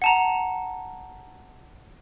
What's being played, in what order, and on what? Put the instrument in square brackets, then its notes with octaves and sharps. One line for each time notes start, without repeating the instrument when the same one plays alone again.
[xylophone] F#5 A5 A#5